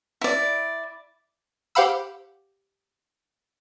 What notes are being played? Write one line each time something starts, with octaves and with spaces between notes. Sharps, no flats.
E4 D5
G4 C5 F5 F#5 B5 E6